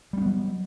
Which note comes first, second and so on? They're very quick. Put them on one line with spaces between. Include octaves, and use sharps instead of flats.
G3 C#4 B3 F#3